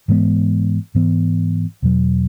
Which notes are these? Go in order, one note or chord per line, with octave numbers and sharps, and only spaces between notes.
G#2 E3 G#3 B3
G#2 E3 B3
E2 B2 F#3